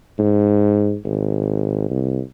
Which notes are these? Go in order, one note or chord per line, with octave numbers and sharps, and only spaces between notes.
G#2
G#1
C2